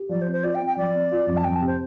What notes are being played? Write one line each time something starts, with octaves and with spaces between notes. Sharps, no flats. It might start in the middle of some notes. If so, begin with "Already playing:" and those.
Already playing: G4
F3 D5
C5
C4
C5
F4 D5
G5
C4
G5
F3 D5
C4
F4
F2
A5
F2 G5
A5
C3
C5